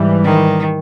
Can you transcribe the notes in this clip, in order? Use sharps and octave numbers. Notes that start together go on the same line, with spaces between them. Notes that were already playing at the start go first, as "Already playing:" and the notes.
Already playing: G#2 E3 G3
D#3